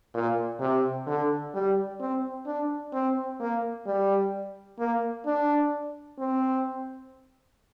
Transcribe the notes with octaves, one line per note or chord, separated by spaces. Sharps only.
A#2
C3
D3
G3
C4
D4
C4
A#3
G3
A#3
D4
C4